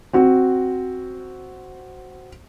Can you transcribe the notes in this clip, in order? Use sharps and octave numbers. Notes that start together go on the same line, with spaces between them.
C4 F#4